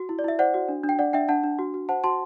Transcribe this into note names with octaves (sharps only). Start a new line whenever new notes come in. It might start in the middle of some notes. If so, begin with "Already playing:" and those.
Already playing: F#4
E4
D5
E4 E5
C5 D5 F#5
F#4
D4
D4
G5
D4 D5 F#5
D4 E5 G5
D4 F#5 A5
D4
F#4
F#4
C5 F#5 A5
F#4 A5 C6